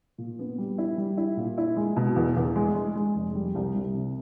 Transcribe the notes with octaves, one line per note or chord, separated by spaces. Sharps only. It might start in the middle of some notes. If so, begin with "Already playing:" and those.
A#2
B3
G3
E4
G3
E4
A#2
E4
G#3
B2
E2
E2
G#3
G#3
G#3
F1
G3
C2
C2
C3